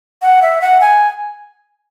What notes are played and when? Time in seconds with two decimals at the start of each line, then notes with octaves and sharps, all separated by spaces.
0.22 F#5
0.42 E5
0.61 F#5
0.81 G#5